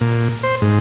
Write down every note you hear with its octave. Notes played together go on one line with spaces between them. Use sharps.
A#2
C5
G#2